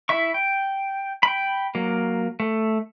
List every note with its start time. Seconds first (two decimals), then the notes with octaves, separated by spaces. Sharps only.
0.09 E4 E5 C#6
0.34 G5
1.23 G5 B5
1.75 F#3 A#3
2.40 A3